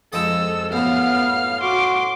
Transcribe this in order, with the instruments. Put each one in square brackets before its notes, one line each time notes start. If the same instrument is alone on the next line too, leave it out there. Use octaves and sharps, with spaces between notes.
[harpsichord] F2 G#3 D#6 [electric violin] A4 E6
[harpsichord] F#2 A2 [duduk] B3 [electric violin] F5 F6
[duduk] F#4 [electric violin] C6 D6